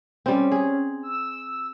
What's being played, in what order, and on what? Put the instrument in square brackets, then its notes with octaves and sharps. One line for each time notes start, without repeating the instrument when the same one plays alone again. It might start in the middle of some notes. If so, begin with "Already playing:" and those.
[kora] G3 C4 [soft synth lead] C#4
[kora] G#4
[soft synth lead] E6